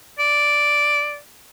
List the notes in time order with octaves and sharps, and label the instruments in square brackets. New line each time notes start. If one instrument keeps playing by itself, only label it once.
[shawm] D5